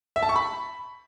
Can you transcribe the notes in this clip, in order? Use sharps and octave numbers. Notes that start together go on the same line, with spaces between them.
E5
A5
C#6
B5